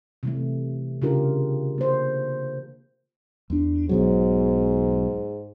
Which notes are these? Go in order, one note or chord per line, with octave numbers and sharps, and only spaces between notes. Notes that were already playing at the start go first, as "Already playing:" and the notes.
C3 E3 A3
C#3 D4 F4 G4 A#4
A#3 C5
E2 D4
B1 G#2 B2 F#3